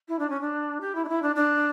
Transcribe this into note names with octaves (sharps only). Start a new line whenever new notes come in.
E4
D4
C#4
D4
G4
E4
D4
E4
D4
D4